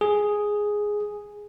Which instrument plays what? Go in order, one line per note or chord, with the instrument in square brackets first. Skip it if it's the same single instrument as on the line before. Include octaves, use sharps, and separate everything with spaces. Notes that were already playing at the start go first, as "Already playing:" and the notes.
[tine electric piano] G#4